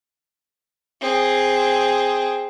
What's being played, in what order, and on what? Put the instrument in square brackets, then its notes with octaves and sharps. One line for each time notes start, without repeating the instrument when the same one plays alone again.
[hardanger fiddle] C4 G#4